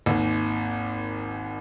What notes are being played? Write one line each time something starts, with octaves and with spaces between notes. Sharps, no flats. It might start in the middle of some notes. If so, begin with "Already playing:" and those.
G#1 D#2